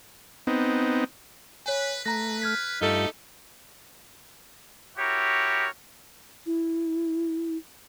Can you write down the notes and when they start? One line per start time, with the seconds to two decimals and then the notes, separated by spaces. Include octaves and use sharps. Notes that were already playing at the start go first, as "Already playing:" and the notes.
0.47 B3 C4 D#4
1.66 B4 C#5 G#5
2.06 A3 B4 A#5 A#6
2.42 F6 G#6 B6
2.82 G2 A3 D#4 F4 G4 A4
4.97 E4 F#4 G4 A#4 C#5
6.46 E4